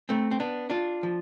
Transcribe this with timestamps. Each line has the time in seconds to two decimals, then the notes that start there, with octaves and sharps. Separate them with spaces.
0.09 A3 C4
0.31 C4
0.40 B3 D4
0.70 D4 F4
1.03 F3